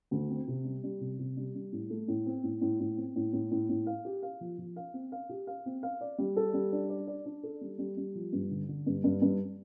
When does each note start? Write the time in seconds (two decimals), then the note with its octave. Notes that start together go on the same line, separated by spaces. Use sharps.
0.11 D2
0.30 C4
0.48 C3
0.65 G3
0.84 G3
1.01 C3
1.19 C3
1.37 G3
1.55 G3
1.72 A2
1.90 A3
2.08 A2
2.26 C4
2.43 A2
2.61 A2
2.80 A2
2.97 C4
3.16 A2
3.33 A2
3.51 A2
3.69 A2
3.87 F5
4.05 G4
4.23 F5
4.41 F3
4.58 F3
4.76 F5
4.93 C4
5.12 F5
5.29 G4
5.47 F5
5.66 C4
5.83 F5
6.01 D5
6.18 G3
6.36 A4
6.54 G3
6.72 D4
6.89 D5
7.07 D5
7.26 D4
7.43 A4
7.61 G3
7.79 G3
7.97 G3
8.15 F3
8.33 G2
8.51 D3
8.68 D3
8.86 G2
9.04 G2
9.22 G2